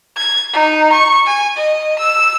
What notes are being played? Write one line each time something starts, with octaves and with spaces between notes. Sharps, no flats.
G#6
D#4
C#6
G#5
D#5
E6